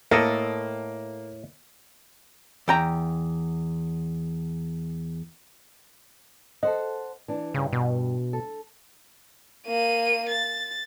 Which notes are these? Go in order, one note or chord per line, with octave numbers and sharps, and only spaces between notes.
A2 A#3 A4 D#5
E2 G5 A#5
A4 C5 D#5 F#5
E3 D4
G2 C#3
B2
A4
A#3 D#7
A6